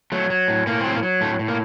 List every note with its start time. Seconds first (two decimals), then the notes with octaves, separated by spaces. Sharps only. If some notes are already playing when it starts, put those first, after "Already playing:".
0.12 F#3 A3
0.30 F#3
0.48 A2
0.67 A2 A#3
0.81 F#3 C4
0.94 A#3
1.03 F#3
1.21 A2 A3
1.39 A2
1.48 A#3